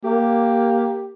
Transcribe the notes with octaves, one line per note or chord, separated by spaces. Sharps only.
A#3 G4